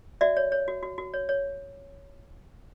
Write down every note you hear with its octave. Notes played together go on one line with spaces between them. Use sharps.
F#4 D5 E5
C#5
C#5
F#4
F#4
F#4
C#5
C#5